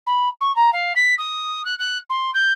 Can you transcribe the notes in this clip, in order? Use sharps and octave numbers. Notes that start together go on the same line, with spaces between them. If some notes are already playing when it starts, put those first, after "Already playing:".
B5
C#6
A#5
F5
B6
D#6
F#6
F#6
C6
G6